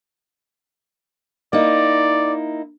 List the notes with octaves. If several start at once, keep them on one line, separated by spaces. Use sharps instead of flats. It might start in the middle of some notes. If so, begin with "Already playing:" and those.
A#3 D#4 E4 D5